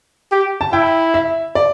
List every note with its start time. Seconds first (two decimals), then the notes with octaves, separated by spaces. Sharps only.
0.32 G4
0.61 A5
0.73 E4 G5
1.14 E5
1.55 D5